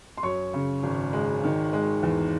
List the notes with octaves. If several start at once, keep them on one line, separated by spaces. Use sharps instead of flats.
C6
F#2 C#5 C#6
C#3
G#1
G#3
D#3
G#3
E2